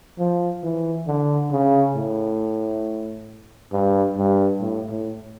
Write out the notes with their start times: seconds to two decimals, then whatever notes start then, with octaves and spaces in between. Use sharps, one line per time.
0.19 F3
0.63 E3
1.07 D3
1.52 C#3
1.96 A2
3.73 G2
4.17 G2
4.61 A2
4.90 A2